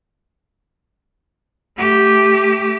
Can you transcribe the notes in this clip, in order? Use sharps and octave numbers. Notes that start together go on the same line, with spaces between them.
A3 G4